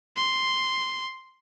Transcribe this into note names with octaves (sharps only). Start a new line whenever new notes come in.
C6